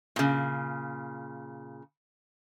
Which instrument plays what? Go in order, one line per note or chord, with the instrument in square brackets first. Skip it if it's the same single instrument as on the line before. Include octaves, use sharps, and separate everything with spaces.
[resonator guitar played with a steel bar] A#2 C#3